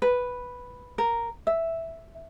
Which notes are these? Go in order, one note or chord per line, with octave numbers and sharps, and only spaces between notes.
B4
A#4
E5